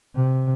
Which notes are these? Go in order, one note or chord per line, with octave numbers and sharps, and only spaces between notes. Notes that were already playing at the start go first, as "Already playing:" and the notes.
C3